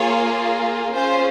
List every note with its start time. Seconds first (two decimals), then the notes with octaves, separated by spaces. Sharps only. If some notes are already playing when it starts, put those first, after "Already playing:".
Already playing: A#3 F4 G#4 C#5
0.95 C#4 F4 G#4 C5